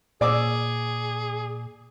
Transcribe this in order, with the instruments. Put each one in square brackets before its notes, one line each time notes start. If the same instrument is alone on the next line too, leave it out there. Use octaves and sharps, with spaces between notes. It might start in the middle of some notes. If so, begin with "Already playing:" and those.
[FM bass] A#2 [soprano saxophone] G#4 [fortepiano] D5 D6 E6